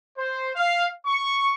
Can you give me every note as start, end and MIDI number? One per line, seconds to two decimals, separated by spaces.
0.17 0.48 72
0.55 0.86 77
1.06 1.53 85